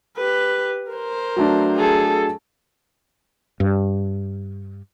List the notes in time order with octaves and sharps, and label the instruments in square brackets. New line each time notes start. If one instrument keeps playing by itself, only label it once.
[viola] G4 B4
A#4 C5
[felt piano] F#3 A3 D4
[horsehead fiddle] G#4 A4
[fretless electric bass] G2